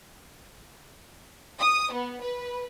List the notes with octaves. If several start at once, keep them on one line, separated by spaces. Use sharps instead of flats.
D#6
B3
B4